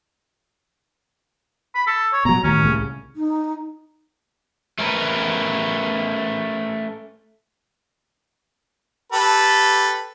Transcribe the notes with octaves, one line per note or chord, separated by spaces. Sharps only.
B5
A4
C#5
B2 F#3 A#5
D#2 A2 C#4
C2 A2 C#3
D#4
A3 C#4 A#4 B4
G4 A4 B4